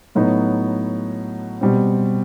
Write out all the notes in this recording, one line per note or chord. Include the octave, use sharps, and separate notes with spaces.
A2 F#3 B3 D#4 F#4
B2 G3 C4